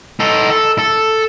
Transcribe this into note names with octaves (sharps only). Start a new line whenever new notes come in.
D#4 A4
A4
A4